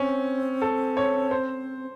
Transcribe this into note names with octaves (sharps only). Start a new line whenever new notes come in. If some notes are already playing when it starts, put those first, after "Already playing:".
Already playing: C4 C#4
A4
C#5
C5